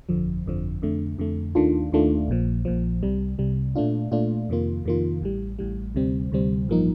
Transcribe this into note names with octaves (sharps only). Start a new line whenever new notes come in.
G1 F2 D3 F3
G1 F2 D3 F3
F2 D3 A3
F2 D3 A3
D#2 D#3 A3 D4 F4
D#2 D#3 A3 D4 F4
A#1 A#2 F3
A#1 A#2 F3
C2 C3 G3
C2 C3 G3
A#2 A3 D4 F4
A#2 A3 D4 F4
F2 C3 D#3 A#3 F4
F2 C3 D#3 A#3 F4
A1 A2 G3
A1 A2 G3
D2 C3 G3 C4
D2 C3 G3 C4
A1 G2 F3 A#3 D#4